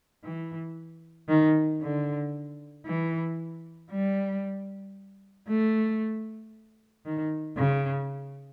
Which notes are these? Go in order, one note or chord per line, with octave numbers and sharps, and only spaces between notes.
E3
D#3
D3
E3
G3
A3
D#3
C#3